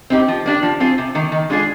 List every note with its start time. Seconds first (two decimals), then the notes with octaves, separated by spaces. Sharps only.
0.10 C4 D#4 G4
0.28 F3
0.46 A#3 D4 G4
0.63 F3
0.80 C4 F4 G#4
0.98 C3
1.15 D#3 A#3
1.32 D#3
1.50 G#3 D4 F4 G#4